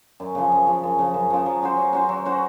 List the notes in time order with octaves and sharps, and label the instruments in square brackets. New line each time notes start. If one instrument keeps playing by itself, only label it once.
[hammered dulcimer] F#2
C#3 F3
F#2
C#3 F3
F#2
C#3 F3
F#2
C#3 F3
F#3
C#4 F#4 C5
F#3
C#4 F#4 C5
F#3
C#4 F#4 C5